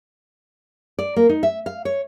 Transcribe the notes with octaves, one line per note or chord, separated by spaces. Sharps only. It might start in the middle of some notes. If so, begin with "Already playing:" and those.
D5
A#3
D#4
E5
F5
C#5